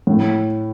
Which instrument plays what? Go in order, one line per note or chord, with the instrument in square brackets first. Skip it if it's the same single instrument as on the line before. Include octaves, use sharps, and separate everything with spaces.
[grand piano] A2